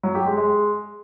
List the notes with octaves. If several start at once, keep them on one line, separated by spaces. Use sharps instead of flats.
F#3
G4
G#3
G#3